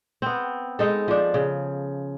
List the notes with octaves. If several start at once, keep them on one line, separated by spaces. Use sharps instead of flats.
B3 C4
G#3 D#4 A4
F3 D4
C#3